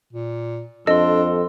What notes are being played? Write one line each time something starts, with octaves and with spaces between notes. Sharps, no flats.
A#2
F2 D4 A4 D#5 C6